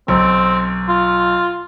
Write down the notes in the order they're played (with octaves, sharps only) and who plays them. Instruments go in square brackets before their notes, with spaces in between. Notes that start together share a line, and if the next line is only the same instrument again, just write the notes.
[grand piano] B1 [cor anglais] C4
[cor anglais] F4